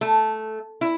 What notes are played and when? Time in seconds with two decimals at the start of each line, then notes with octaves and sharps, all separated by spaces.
0.01 A3
0.81 E4